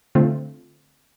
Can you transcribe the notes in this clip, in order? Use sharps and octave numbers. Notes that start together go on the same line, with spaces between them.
D3 A3 C4 F4